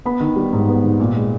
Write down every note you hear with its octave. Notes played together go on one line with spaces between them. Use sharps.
B3 B5
D#3
G3
G#2
B3
D#3
A#2
G#3